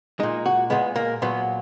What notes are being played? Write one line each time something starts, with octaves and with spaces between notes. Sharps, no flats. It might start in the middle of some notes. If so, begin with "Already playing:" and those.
A#2 G#3 D#4
F#4
A#2 G#3 B3
A#3
A#2 F#3 B3